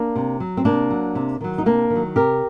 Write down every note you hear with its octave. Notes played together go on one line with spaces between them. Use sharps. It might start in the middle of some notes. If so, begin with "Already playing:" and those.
Already playing: A#3 D4
C3
F#3
C4
C3 A#3 D4
F#3
C3
D#3 F#3
D#4
C3 A#3 D4
D#3
F#3
C3 G4 A#4